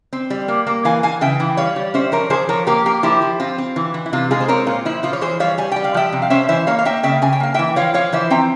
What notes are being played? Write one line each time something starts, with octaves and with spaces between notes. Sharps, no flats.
C4
G3
A#3
A#3
E3 F5 G#5
E3 F5 G#5
C#3 E5 G5
E3
G3 C#5 F5
G3
C#4 C5 E5
F3 A#4 C#5
F3 G#4 C5
F3 A#4 C#5
A#3 G4 A#4
A#3 G4 A#4
F3 E4 G4
F3
C4 F4
C4
E3
E3
E4
C3 F4
G#3 F4 G#4
C5
C4 A#4 C#5
A#2 F4
F3 E4
F3 F4
C#5
E3 G#4 C5
G3 C#5 F5
G3 G#5
G3 G5
F5
F3 E5 G5
C3
F5
C#4 C5 E5
E3 C5 E5
A#3 C#5 F5
F5
A#3 E5 G5
C#3 E5 G5
C#3 G#5
G5
A#3 F5
E3 E5 G5
F3 C#5 F5
F3 C#5 F5
E3 C5 E5
C4 G5 A#5